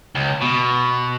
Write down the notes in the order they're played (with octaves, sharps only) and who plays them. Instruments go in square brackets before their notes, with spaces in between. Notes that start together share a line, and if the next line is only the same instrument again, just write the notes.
[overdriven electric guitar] C#2
B2